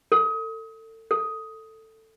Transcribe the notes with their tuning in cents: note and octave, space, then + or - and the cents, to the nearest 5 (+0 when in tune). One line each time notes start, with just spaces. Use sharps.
A4 +30
A4 +10